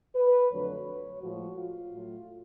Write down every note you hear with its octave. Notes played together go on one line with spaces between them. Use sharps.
B4
F2 D3 F#3 A3 C#5
A2 F3 G#3 F#4
F4
A2 F#3 A3